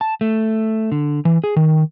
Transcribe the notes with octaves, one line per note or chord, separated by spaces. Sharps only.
A5
A3
D3
E3
G#4
D#3